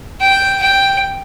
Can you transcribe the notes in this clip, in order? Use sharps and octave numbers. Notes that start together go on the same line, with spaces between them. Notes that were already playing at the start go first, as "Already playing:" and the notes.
G5
G5